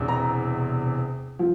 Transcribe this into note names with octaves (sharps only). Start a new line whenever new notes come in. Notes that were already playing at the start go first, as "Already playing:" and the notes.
Already playing: E1 E2 C3
A#5
F3